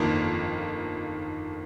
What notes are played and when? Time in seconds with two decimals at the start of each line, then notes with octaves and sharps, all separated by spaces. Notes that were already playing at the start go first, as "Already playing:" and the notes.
Already playing: G1 F2 D#3 A#3